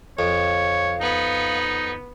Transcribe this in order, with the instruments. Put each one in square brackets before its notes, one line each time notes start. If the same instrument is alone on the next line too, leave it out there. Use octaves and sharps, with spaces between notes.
[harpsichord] F2 [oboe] C#5 [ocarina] F5
[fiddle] B3 [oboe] D#4